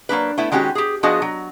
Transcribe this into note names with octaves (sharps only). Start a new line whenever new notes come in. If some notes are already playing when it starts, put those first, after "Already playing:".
F#3 A#3 D4 B4
A3 B3 E4
D#3 G#3 C#4 F#4 G4
G4 G#4
F3 B3 D4 F#4 G#4 D#5
F#3